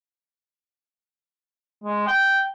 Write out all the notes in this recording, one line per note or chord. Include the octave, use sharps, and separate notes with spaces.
G#3
G5